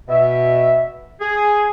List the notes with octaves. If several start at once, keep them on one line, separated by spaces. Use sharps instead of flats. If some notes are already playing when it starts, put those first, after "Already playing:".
B2 E5
G#4